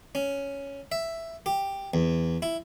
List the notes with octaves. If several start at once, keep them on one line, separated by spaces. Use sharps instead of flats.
C#4
E5
G4
E2
E4